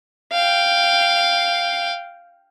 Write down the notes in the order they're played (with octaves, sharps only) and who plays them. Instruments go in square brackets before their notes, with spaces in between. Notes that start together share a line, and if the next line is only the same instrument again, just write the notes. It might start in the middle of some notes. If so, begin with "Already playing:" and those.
[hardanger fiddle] F5 G5